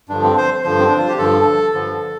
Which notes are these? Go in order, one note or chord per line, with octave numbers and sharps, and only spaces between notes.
G2 D3 F3 D4
C4
C5
G2 D3 F3 C5
C4
D4
F4
G4
G2 D3 F3 A4
G2 D3 F3